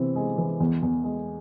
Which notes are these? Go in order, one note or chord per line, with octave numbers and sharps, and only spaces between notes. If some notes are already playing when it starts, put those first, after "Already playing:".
Already playing: C3 E3 C4
G#3
E3
E2
E2
G#3